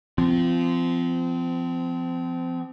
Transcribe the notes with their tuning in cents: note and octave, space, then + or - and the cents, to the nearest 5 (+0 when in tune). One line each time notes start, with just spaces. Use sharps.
F3 -20 C4 -30